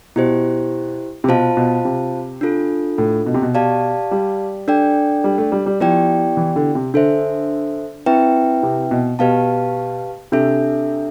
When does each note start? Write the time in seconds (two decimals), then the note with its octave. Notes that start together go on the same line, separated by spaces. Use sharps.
0.16 B2 E4 G4 C5
1.24 C3
1.29 B2 F4 C5 F5 A5
1.57 B2
1.85 C3
2.41 D4 F4 A4
2.98 A2
3.26 B2
3.34 C3
3.42 B2
3.55 G4 D5 F5 A5
4.11 G3
4.68 D4 A4 D5 G5
5.24 G3
5.38 A3
5.52 G3
5.66 G3
5.80 F3 B3 E4 G4 D5 G5
6.37 E3
6.56 D3
6.75 C3
6.94 D3 D4 A4 C5 E5
8.06 C4 E4 B4 E5 G5
8.63 C3
8.91 B2
9.19 B2 G4 B4 F5 A5
10.32 C3 D4 A4 E5